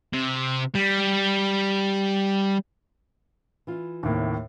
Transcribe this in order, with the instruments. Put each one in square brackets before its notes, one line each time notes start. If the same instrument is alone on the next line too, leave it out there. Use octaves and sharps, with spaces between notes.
[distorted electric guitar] C3
G3
[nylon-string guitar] E3 F4
[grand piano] D#2 A2 [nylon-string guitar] C3 A#3